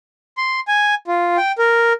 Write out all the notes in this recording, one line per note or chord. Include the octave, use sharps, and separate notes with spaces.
C6
G#5
F4
G5
A#4